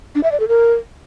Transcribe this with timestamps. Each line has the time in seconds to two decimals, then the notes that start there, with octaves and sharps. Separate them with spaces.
0.15 D4
0.23 E5
0.32 D5
0.40 A4
0.48 A#4